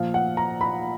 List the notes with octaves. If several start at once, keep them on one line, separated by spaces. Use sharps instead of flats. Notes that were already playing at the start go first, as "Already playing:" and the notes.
Already playing: A#2 F3 F5
F#5
A#5
B5